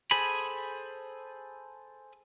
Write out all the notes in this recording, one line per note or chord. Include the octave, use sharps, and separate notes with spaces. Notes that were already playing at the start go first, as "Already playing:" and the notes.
G#4 A4 C5 G#5 B5